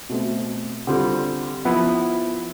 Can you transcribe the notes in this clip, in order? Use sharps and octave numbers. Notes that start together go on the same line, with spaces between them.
B2 A3 C4
D3 G3 C4 F4
F3 B3 E4